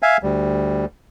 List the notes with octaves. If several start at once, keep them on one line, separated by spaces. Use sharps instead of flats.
E5 F5 G#5
D2 G3